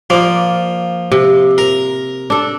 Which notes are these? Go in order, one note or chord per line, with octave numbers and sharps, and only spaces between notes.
F3 A#3 D5
C3
A#4
D4 A4